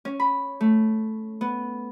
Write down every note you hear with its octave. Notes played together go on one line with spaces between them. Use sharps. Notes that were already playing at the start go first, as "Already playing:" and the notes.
C#4
B5
A3
B3